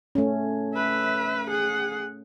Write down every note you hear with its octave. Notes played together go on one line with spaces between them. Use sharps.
A3 C#4
B4 E5
G#4 F#5